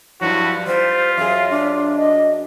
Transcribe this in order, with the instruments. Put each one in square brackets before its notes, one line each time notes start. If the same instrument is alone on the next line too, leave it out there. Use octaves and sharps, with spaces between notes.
[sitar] G2 F3 F#3 [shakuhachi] E4 [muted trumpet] F#4
[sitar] G3 [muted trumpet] F4 [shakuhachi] C5
[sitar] F#2 G#4 [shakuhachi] F5
[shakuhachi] D4
[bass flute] D#5